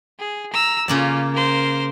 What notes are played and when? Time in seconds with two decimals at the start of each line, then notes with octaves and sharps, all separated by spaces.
0.20 G#4
0.54 A#5 E6
0.88 C#3 A#3 C#4 F4 D5
1.34 A#4 C5